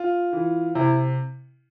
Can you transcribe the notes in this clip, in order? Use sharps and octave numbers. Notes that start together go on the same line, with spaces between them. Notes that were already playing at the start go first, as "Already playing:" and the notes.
Already playing: F4
E3
C3 E4